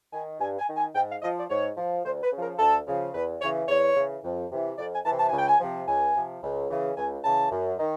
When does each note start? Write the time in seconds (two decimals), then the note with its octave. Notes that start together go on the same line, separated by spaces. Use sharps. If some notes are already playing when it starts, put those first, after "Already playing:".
0.13 D#3 G#5
0.40 G2 G#5
0.59 G#5
0.68 D#3
0.77 G#5
0.95 G#2 G5
1.09 F5
1.22 F3 D#5
1.36 D5
1.49 G#2 C#5
1.77 F3
2.04 D2 C5
2.23 B4
2.32 C#3 F3
2.42 A#4
2.59 D2 A4
2.87 C#3 F3
3.14 E2 B4
3.41 C#3 E3 C#5
3.68 E2 C#5
3.95 C#3 E3
4.23 F2
4.51 C3 E3
4.78 F2 D5
4.92 G#5
5.05 E3 A5
5.09 C3
5.19 A5
5.29 C#2 G#5
5.38 G5
5.47 G#5
5.60 C3 F3
5.88 C#2 G#5
6.15 C3 F3
6.43 C#2
6.69 C#3 E3
6.97 C#2 G#5
7.24 C#3 E3 A5
7.51 F#2
7.79 D#3